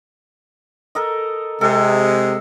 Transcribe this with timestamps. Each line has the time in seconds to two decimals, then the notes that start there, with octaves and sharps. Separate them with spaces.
0.95 A4 A#4 D#5
1.61 C3 G#3 A4